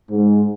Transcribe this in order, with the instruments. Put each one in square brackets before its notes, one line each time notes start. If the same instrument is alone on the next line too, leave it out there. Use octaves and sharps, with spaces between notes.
[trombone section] G#2